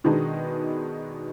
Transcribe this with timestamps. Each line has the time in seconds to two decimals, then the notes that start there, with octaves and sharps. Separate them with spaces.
0.04 B2 D#3 G#3 B3 D4 D#4